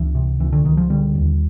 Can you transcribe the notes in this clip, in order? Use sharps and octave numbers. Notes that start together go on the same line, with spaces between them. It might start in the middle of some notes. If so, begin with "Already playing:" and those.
Already playing: C#2 E3
C3
C#2 E3
D3
C#2 D#3
F3
D3 G3
D#2